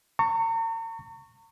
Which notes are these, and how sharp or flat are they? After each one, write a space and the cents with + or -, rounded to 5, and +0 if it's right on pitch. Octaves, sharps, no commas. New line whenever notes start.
A#5 -40 C#6 +0